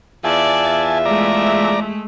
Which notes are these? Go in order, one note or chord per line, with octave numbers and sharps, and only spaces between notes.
E2 F4 D5 E5 G#5 A5
G#3 A3 D5 A#5